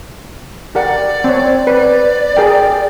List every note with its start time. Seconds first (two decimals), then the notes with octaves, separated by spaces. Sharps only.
0.75 G4 A#4 D5 F#5
1.24 C4 C#5
1.67 B4 D5
2.37 G#4 A#4 G5